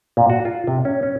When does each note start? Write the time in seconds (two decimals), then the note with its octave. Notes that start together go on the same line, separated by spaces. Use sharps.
0.17 A#2
0.30 F#4
0.45 F4
0.67 C3
0.85 C#4
1.03 C#4